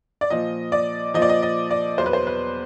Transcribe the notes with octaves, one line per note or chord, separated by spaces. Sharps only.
D5
A#2 F3 D#5
D5
A#2 F3 D5 D#5
D#5
D#5
D5
E2 B2 F#3 C5
B4
C5
B4